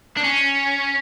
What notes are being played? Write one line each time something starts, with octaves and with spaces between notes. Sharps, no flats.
D4
C#4